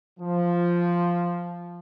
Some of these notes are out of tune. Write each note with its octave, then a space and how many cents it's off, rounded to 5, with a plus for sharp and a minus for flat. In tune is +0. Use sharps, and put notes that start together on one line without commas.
F3 -5